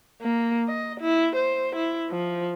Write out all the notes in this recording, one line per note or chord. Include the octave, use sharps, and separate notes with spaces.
A#3
D#5
E4
C5
E4
F3